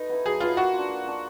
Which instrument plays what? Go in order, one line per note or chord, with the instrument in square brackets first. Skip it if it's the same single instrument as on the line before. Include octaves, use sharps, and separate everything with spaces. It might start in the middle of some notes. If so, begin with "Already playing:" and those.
Already playing: [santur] A3 B4 [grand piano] D#4
[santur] B3 E4
[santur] F#3 [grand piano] G#4
[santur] B3 E4 [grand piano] F4
[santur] A#3 [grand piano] F#4
[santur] D4 F4
A#3
D4 F4